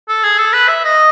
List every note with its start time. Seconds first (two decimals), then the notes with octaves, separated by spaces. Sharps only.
0.08 A4
0.24 G#4
0.38 A4
0.53 B4
0.68 E5
0.84 D#5